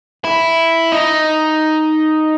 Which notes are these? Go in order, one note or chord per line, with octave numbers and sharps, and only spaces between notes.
E4
D#4